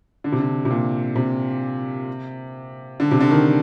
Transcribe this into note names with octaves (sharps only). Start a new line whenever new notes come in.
D3
C3
D3
C3
A#2
C3
D3
C3
D3
D#3